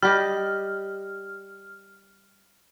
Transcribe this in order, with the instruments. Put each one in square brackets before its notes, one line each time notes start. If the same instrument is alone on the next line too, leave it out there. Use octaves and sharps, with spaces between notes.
[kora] G3 G4 D#5 [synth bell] F6